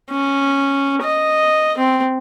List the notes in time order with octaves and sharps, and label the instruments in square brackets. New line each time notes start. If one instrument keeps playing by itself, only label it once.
[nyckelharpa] C#4
D#5
C4